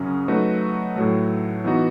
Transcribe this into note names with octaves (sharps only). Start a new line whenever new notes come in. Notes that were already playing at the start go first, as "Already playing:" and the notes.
Already playing: F#2 C#3 F#3 C#4 G#4
F#3 A3 D#4 F#4 B4
A2 F#3 A3
E3 B3 D#4 F#4